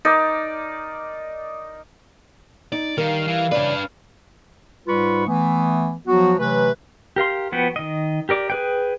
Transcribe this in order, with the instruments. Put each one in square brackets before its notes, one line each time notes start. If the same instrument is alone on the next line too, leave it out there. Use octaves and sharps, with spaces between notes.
[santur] D#4 A#4 D5
[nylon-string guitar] D#4 [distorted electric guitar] D5
[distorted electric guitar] D#3 [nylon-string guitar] G3 A#4 [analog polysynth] F5
[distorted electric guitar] E3
[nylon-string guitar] C#3 E3 D5 [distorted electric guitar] D4 B4
[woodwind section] G#2 G3 F4 B4 B5 C#6
E3 A3 B3
F3 F#3 B3 F#4
C3 E3 F#3 A3 B4
[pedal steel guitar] G4 A#4 F5 C6
F3 B3 F#4 B4 G5
D#3 D#5
G4 A#4 D5 D6
G#4 B4 G5